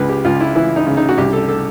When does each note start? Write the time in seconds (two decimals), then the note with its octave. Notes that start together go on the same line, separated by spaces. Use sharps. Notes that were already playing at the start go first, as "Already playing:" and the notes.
Already playing: C#2 C#3 B4
0.09 G4
0.25 C#2 F4
0.40 E4
0.56 E3 E4
0.76 D#4
0.87 C#3
0.97 D#4
1.09 F#4
1.18 C2 G4
1.33 A4
1.48 A4